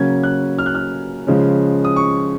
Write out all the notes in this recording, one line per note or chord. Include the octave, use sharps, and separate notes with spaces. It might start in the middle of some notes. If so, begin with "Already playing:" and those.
Already playing: C#3 F#3 A#3 C#4 G#6
F#6
F6
F#6
F6
C#3 F3 G#3 C#4
D#6
C#6